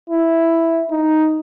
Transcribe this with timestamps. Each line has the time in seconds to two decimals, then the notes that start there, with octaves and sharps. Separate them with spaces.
0.10 E4
0.90 D#4